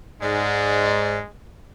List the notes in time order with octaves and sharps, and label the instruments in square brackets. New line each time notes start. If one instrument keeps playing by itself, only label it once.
[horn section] G#2 [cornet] G#3 [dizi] D5